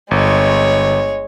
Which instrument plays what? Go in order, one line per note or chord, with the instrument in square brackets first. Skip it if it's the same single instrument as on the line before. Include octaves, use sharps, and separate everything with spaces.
[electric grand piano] G1 [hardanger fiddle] G#3 C#5